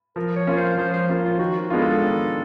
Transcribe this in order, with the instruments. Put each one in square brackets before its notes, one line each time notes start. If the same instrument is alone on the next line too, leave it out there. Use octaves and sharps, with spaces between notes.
[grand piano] F3 [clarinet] A#4
[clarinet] C#5
[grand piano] A#3 C#4 F4
[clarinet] C5
[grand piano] F3 [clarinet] C5
[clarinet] C5
[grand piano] A#3 C#4 F4
[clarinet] F4
[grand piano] D#3 [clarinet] F#4
[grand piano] G#3 B3 D4 F4
[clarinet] A4
[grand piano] D#3